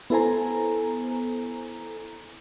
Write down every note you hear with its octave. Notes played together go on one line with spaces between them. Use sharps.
B3 E4 A4 C5 G#5 A#5